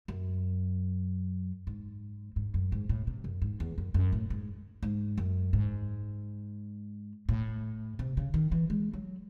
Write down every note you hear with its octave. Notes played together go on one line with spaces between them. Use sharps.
F#2
G#2
G#2
F#2
G#2
A2
C3
F#2
G#2
E2
F#2
F#2
A2
G#2
G#2
F#2
G#2
A2
C3
C#3
D#3
E3
G#3
F#3